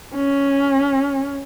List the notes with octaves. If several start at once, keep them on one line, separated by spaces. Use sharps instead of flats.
C#4